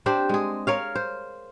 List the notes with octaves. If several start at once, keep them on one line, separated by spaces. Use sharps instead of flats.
C4 D4 G4 C5
G#3 G#4
A#4 C#5 F5
C5